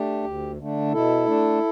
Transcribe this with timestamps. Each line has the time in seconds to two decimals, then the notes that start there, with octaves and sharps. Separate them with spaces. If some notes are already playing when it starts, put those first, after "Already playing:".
Already playing: A3 D4 G4
0.24 D2
0.58 D3 A3 D4
0.92 B2 E4 A4
1.26 A3 D4